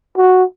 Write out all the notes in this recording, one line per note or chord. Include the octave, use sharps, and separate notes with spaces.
F#4